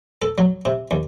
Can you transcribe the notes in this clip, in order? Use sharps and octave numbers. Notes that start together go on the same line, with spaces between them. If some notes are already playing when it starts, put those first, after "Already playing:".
A4
F#3
C3
D#2